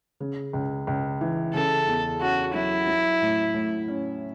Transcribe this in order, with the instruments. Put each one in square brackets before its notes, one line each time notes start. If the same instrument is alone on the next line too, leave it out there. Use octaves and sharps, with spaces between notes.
[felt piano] C#3
C#2
C#2
E3
[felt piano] C#3 [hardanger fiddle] A4
[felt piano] E2
[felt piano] C#4 [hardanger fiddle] F#4
[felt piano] F#3 [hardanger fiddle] E4
[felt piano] F#3
A2
A2
C#4